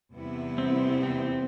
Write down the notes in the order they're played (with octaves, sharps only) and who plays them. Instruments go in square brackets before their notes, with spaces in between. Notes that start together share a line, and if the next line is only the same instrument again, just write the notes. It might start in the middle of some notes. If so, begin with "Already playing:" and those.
[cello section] E2 C3 G3 B3 E4
[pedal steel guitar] C4
C4